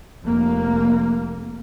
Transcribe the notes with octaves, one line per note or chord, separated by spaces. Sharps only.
F1 A#3